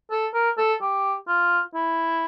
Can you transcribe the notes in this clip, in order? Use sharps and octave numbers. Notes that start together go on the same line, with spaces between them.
A4
A#4
A4
G4
F4
E4